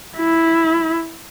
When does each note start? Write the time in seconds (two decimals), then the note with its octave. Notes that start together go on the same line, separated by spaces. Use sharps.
0.17 E4